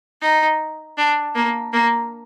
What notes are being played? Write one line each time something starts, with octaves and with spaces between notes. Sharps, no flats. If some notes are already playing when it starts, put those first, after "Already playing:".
D#4
D4
A#3
A#3